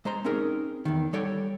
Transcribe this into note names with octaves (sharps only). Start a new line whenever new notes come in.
G#3 C5 A#5 C6
C4 C#4 D#4 G#4 A#4
E2 D#3
G3 A4 C#5 F#5 G5